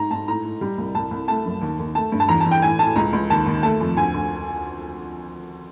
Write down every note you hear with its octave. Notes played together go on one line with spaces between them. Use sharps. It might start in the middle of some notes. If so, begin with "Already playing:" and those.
Already playing: G#2 A#5
G#2 A5
A2 A#5
A2
G3
C2
C2 A5
C2
A3 A5
F#2
D#2
D#2
A3 A5
G2
A5
E2 A#5
A5
E2
G5
A2 G#5
A2 A5
C#2 A#5
C#2
D#2 A5
D#2
A3 A5
F2
D2 G#5
D2